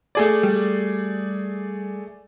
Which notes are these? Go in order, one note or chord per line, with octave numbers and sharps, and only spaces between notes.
A3 G#4 D5
G3